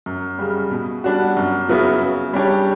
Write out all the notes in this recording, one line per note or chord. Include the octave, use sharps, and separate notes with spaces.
F#2
C#3 G3
B2
G3 D4 F#4
F#2
C#3 F#3 B3 E4
C#3
G3 D4 G4 C#5